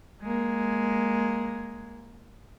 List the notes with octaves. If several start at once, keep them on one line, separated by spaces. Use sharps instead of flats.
G#3 A#3